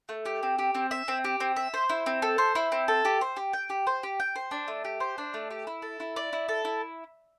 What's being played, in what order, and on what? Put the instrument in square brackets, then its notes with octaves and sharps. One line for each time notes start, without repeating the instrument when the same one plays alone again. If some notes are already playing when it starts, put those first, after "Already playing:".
[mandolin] A3
G4
C4
G4
C4
E5
C4
G4
C4
E5
C5
E4
C4
A4
C5
E4
C4
A4
G4
C5
G4
G5
G4
C5
G4
G5
C5
D4
A3
G4
C5
D4
A3
G4
E4
A4
E4
D5
E4
A4
E4